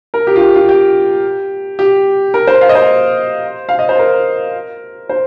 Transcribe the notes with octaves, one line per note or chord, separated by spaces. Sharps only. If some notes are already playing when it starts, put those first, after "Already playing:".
A#4
G4
F4
G4
F4
G4
G4
A#4
C5
F5
D#5
C5
F5
D#5
C5
A#4
C5